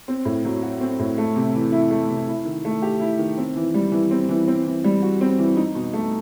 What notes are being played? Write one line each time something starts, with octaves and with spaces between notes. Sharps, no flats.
C4
A2
F#3
F#4
C4
A2
A3
C3
E3
E4
A3
C3
E4
D#3
A3
G4
E4
D#3
C4
E3
G3
E3
C4
E3
C4
E3
G3
F#4
C4
E3
D#4
B2
A3